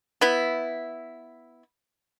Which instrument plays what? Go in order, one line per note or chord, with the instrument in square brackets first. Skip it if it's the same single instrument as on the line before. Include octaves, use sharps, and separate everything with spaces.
[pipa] B3 E4